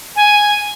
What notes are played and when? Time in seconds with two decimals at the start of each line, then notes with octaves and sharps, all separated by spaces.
0.16 G#5